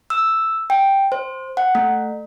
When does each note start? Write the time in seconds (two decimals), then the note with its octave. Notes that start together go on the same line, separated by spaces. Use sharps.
0.10 E6
0.70 G5
1.12 C5
1.57 F#5
1.75 A3